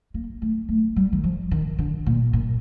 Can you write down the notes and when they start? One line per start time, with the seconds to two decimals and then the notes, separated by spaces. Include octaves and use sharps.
0.14 A#3
0.42 A3
0.69 A3
0.96 G3
1.13 D#3
1.24 F3
1.51 D#3
1.79 D3
2.06 A#2
2.33 A#2